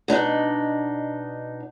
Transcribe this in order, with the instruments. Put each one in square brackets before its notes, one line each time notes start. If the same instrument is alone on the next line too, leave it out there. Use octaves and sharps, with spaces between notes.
[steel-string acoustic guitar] B2 D4 D#4